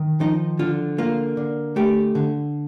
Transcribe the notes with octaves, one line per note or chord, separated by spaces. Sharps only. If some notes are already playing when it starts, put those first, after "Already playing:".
Already playing: D#3
F3 D#4
D3 F4
A#3 F4
D3
A3 G4
D3